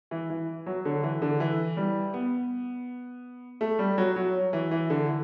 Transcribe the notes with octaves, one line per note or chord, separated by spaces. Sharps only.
E3
E3
F#3
D3
E3
D3
E3
G3
B3
A3
G3
F#3
F#3
E3
E3
D3
E3